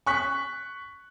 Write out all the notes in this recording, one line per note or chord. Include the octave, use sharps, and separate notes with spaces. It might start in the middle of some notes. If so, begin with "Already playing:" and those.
C#6 F#6 B6